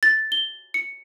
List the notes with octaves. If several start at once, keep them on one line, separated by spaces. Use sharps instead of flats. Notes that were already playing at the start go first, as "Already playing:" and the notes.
A6
G7
C#7